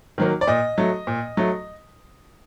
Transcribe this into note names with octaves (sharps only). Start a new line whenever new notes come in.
D#3 F#3 A#3
D5
A#2 D#5
F#3 A3
A#2
F#3 A3